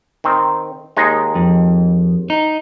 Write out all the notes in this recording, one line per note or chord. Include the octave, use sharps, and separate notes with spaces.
D#3 C4
D#2 G#3 D#4
F2
D#4